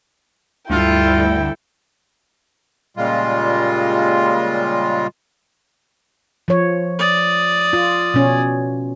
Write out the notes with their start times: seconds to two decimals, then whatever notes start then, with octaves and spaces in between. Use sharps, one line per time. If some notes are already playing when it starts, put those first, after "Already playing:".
0.70 D2 G2 E4 F4 A4 G5
2.97 A#2 C#3 G3 G#3 F4
6.48 F3 C#5
6.99 D5 D#6
7.73 F4
8.14 B2 C#4